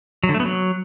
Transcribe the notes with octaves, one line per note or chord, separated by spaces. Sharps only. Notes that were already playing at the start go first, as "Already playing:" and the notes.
F#3
D3
A3
B3
F#3